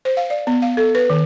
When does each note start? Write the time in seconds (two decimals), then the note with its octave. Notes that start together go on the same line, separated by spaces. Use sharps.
0.05 C5
0.17 F5
0.30 D5
0.47 B3
0.62 F5
0.77 A4
0.95 B4
1.10 D#3